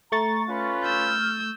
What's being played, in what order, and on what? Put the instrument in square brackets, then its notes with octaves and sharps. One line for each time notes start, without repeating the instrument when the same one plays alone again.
[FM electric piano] A3 C#6 A6 [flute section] A#5
[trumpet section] C#4 F4 B4 [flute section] F#6
[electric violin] E6 G6 [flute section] F6